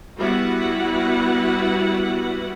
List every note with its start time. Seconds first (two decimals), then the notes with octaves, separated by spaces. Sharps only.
0.17 G3 B3 E4 F#4 B4 F#5